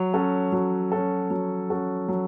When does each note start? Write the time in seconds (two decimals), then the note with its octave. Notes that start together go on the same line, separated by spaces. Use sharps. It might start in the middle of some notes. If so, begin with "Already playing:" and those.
Already playing: F#3
0.13 C#4 F#4 A4
0.52 F#3
0.92 C#4 F#4 A4
1.30 F#3
1.70 C#4 F#4 A4
2.09 F#3